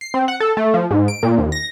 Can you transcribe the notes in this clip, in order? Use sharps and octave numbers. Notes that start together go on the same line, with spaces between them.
C7
C4
F#5
A4
A3
F3
G#2
D7
A#2
D#2
A#6